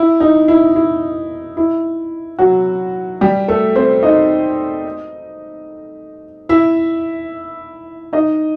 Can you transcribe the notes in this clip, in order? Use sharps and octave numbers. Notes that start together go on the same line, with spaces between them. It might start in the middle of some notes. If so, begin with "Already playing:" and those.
Already playing: E4
D#4
E4
E4
E4
F#3 F#4
G3 G4
A3 A4
C4 C5
D#4 D#5
E4 E5
D#4 D#5